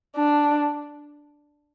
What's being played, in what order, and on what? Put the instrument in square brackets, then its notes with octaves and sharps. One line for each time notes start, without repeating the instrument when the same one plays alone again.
[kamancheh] D4